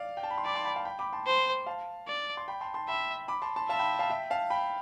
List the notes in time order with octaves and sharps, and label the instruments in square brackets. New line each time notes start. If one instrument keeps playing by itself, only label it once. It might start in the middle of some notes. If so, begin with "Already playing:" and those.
Already playing: [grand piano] D5 F5
G5
A5
B5
C6
[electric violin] D5 [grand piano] B5 D6
[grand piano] A5 C6
G5 B5
F5 A5
G5 B5
B5 D6
A5 C6
[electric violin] C5
[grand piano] F5 A5
[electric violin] D5
[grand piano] C6
G5 B5
A5 C6
A5 C6
[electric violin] E5 [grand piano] G5 B5
[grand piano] B5 D6
A5 C6
A5 C6
[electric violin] E5 [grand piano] F5 A5
[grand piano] G5 B5
F5 A5
E5 G5
F5 A5
G5 B5